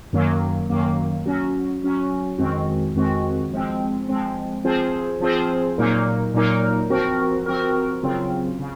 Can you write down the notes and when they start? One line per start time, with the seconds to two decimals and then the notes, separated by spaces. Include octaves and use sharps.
0.13 F#2 D#3 F#3 A#3
0.70 F#2 D#3 F#3 A#3
1.26 F#3 C#4 F#4
1.83 F#3 C#4 F#4
2.38 F2 D#3 G#3 C4 F#4
2.95 F2 D#3 G#3 C4 F#4
3.52 F3 G#3 C4
4.08 F3 G#3 C4
4.64 F3 C4 F4 G#4 C5
5.20 F3 C4 F4 G#4 C5
5.78 A#2 F#3 A#3 D#4 A#4
6.34 A#2 F#3 A#3 D#4 A#4
6.90 F3 C4 F#4 A#4
7.46 F3 C4 F#4 A#4
8.03 C#3 F#3 C4 F4
8.60 C#3